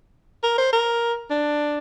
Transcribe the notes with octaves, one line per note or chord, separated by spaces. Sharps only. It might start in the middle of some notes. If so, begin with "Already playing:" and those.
A#4
C5
A#4
D4